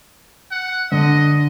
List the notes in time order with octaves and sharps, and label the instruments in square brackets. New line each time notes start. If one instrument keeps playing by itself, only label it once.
[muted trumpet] F#5
[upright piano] D3 [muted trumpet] D#5